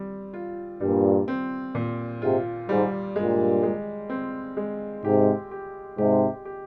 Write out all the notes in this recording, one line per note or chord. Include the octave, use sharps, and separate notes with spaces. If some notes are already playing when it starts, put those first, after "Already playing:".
Already playing: G3 C4
F4
G2 A#2 G3
C4
A#2
G#2 C3 F4
G#2 G3
G2 A#2 G#3
G#3
C4
G#3
G#2 C3 G4
G4
G#2 C3 G4
G4